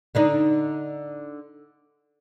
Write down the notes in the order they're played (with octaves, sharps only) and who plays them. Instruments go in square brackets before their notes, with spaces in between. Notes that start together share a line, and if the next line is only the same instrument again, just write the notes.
[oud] D3 D4 D#4